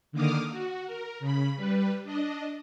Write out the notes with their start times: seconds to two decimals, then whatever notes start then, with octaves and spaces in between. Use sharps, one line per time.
0.12 D3 D#3 A#3 D6 D#6 F6
0.51 F#4
0.86 A#4
1.20 C#3 B5
1.56 G3 B4
2.03 D4 D#5